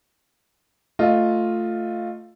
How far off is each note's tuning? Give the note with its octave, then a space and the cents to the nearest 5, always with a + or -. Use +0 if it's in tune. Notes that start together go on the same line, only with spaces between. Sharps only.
A3 +10 F4 +0 D#5 +0